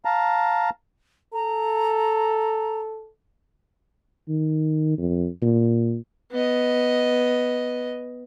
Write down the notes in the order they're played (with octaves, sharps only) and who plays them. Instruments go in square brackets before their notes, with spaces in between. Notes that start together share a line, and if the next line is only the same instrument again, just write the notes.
[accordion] F5 A5 A#5
[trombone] A4 [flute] A#5
[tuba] D#3
F2
A#2
[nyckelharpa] B3 D#5